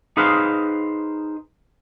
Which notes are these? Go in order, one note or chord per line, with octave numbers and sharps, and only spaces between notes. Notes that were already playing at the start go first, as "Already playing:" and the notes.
D#4 G#4 B4 C5 F5